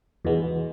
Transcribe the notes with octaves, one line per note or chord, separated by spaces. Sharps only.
E2 B2 G#3 B3